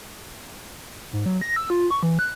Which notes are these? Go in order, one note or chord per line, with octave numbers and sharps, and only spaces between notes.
G#2
F#3
A#6
E6
F4
C#6
E3
F#6